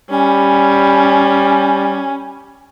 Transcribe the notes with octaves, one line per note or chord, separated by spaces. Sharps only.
G3 C#4 G#5